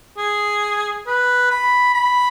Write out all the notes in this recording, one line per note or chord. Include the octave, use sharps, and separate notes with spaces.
G#4
B4
B5
B5